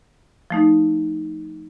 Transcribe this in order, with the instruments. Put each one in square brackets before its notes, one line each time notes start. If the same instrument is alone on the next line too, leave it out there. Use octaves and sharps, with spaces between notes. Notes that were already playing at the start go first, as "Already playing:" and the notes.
[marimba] F3 A3 D#4